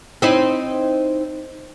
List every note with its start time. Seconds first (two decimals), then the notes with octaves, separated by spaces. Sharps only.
0.22 C4 D#4 E4